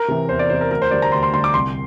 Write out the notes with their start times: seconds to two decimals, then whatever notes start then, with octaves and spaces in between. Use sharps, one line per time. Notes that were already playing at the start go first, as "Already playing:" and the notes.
Already playing: A#4
0.08 C3 E3
0.29 E2 C5
0.39 D5
0.50 C3 E3 C5
0.61 A#4
0.71 D2 A#4
0.82 C5
0.91 D3 G3 D5
1.02 A#5
1.12 D2 C6
1.23 C6
1.33 D3 G3 C6
1.44 D6
1.54 C2 C6